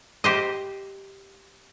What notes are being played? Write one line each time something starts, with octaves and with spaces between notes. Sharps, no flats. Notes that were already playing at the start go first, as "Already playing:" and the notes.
G4 C5 D#5